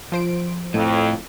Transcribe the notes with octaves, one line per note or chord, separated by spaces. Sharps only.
F3 C5 D7
F2 A2